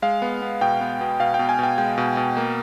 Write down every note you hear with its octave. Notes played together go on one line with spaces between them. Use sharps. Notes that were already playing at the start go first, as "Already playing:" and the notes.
G#3 F5
B3
B3
B2 G5
B3
B2
B2 F5
G5
B2
G#5
B2 G5
G#3 G5
B2
B2
A#3